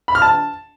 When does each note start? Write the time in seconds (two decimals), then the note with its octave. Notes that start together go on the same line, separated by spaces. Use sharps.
0.08 B5
0.15 F6
0.22 A5